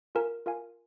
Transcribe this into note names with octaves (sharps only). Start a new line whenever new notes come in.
F4 A#4 F5 G#5
F4 A#4 F5 G#5